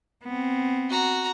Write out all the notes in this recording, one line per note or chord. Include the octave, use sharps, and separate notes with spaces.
B3 C4
F#4 A#5